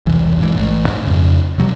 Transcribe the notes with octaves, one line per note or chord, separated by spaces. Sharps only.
E1 C2 E3
G#2 E3 G#3
A1 A3
G#2
F2 C#3
C3 F#3 G3